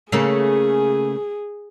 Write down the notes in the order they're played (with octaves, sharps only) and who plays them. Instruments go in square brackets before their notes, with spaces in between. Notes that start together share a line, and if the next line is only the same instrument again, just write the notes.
[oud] C#3 A3 A#3 [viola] G#4